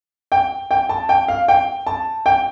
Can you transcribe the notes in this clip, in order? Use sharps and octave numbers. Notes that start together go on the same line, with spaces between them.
G5
G5
A5
G5
F5
G5
A5
G5